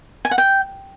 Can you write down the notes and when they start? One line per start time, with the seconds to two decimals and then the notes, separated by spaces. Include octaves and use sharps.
0.25 G#5
0.31 F#5
0.38 G5